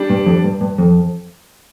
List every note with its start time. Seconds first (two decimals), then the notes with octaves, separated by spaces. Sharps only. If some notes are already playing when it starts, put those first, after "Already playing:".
Already playing: G3 D4
0.10 G2
0.26 F2
0.44 G2
0.61 G2
0.78 F2